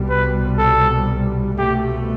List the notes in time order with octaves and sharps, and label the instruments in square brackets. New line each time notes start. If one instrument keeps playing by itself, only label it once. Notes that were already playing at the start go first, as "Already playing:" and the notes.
Already playing: [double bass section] C2 B2 G3
[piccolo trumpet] B4
A4
[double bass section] C2 B2 A3 [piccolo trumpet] G4